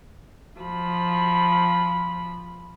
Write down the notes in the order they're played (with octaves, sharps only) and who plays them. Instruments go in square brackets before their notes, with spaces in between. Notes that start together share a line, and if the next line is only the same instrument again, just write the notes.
[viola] F3 B5